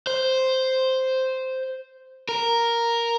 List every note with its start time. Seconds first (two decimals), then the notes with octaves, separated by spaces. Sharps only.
0.07 C5
2.29 A#4